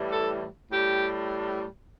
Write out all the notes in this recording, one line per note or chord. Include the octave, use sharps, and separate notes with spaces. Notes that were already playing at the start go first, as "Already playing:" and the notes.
Already playing: A2 E3 G3
A4
A2 G3 G4